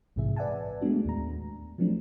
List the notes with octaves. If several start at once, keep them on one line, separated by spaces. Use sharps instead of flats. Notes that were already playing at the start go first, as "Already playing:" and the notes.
A#1 G#2 C3 E3 G#4 E5
B4 D5 E5 F#5 G#5 A5
G#3 A3 B3 D4 F#4
D#2 A2 A#5
F3 F#3 A3 C4 D4